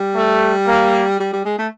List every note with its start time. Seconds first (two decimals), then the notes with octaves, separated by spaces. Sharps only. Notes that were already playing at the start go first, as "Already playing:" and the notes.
Already playing: G3
0.15 A3
0.66 A#3
1.20 G3
1.33 G3
1.45 G#3
1.59 A3